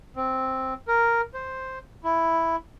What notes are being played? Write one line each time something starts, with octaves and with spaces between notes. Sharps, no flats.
C4
A#4
C5
E4